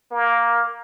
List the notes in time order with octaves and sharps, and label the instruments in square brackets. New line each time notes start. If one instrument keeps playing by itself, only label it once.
[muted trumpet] A#3